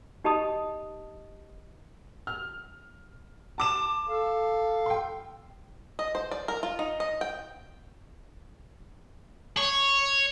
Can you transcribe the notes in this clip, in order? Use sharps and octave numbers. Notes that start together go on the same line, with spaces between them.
D#4 G4 D#5 A5 B5 D#6
F6
A5 D6 E7
A4 F5
G5 C6
D#5
C5
D5
A#4
F4
D#4
D#5
G5
C#5